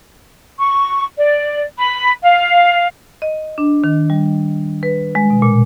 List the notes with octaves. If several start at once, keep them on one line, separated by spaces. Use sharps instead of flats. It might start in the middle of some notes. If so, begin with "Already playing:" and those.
C#6
D5
B5
F5
D#5
D4
D#3
G3
B4
G#3
B2
A#2